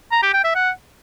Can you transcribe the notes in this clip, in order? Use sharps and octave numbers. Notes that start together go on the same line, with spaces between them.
A#5
G4
G5
E5
F#5